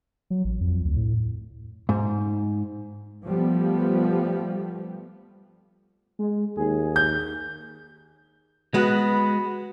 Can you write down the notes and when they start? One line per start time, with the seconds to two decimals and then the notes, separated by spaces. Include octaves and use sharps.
0.30 F#3
0.44 A1
0.61 F2
0.85 D2
0.96 A2
1.89 G#2
3.25 F3 G3 A3 B3
6.19 G#3
6.57 D#2 G#4
6.96 G6
8.74 G#3 B3 F#4 B4